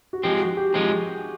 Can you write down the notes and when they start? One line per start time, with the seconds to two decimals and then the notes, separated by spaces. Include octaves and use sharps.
0.13 F#4
0.24 F3 G#3 C4 G4
0.40 F#4
0.57 G4
0.73 F3 G#3 C4 G#4